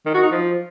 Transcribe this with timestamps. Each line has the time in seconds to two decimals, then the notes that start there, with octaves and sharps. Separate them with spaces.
0.06 D#3
0.14 F#4
0.23 D#4
0.31 F3